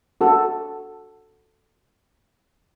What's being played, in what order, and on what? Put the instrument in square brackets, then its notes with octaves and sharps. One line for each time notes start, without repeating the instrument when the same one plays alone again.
[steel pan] F#4 A4